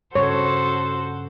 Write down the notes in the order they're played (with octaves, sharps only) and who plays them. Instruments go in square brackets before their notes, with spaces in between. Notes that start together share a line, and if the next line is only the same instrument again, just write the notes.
[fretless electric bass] G2 C#3 [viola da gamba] F#4 A4 C5 [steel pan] C#5